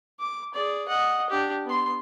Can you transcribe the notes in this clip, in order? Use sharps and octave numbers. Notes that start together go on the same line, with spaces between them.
D6
G#4 D5
D#5 F#5
D4 G4
B3 C6